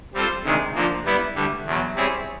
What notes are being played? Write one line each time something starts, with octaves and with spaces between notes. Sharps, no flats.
G3 C4 F4 A4 C5
D2 C3 D#3 G#3
D3 F3 A#3
G3 B3 E4
D2 D3 G3
E2 B2 F#3
G3 C4 E4 G#4 C#5